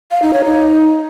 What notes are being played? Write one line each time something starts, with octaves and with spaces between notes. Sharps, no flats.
F5
D#4
C#5
D#4